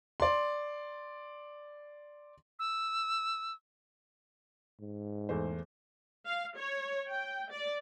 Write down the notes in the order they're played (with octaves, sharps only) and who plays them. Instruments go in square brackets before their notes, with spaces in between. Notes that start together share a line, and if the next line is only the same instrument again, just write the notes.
[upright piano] D5 C6
[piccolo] E6
[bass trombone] G#2
[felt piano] E2 A3 C5
[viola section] F5
C#5
G5
D5